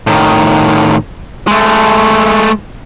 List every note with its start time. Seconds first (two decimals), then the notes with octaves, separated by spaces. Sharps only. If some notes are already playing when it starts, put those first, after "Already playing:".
0.07 A2 D#3
1.47 G#3 A3